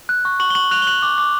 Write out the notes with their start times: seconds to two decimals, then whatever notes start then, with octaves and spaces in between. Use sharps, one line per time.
0.09 F#6
0.25 C#6
0.40 C#6 F#7
0.50 G7
0.55 C#6 F#7
0.71 F#6 F7
0.82 G7
0.87 F#6 F#7
1.03 D6
1.18 D6